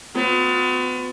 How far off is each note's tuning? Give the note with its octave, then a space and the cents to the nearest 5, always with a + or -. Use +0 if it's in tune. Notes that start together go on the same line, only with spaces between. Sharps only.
B3 +40 F#4 -45